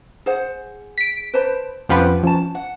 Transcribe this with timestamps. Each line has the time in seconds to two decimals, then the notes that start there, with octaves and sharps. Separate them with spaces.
0.26 G#4 C5 F#5
0.98 B6 D7
1.34 B4 C5 A5
1.89 F2 F3 C#4 G4 B4 F#5
2.23 F3 C#4 A5
2.55 F#5